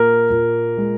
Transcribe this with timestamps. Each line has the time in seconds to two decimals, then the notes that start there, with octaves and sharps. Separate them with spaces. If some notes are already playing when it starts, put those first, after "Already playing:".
Already playing: A#2 A#3 A#4
0.30 A#2
0.78 G#3